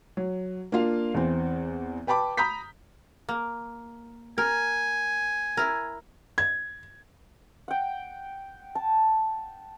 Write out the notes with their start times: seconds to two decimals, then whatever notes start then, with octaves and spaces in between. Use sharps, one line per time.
0.17 F#3
0.72 A#3 D4 F4 F5
1.14 E2 E3 C4
2.07 B4 G5 A5 B5 D6
2.37 A#5 B5 D#6 G6 B6
3.29 A#3
4.38 A#4 G#5
5.57 E4 A#4
6.38 G#6
7.68 F#5 G5
8.75 A5